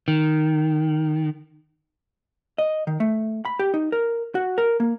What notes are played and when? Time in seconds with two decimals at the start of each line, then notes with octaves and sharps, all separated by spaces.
0.08 D#3
2.58 D#5
2.87 D#3
3.00 A3
3.45 B5
3.59 G4
3.74 D#4
3.92 A#4
4.35 F#4
4.58 A#4
4.80 A#3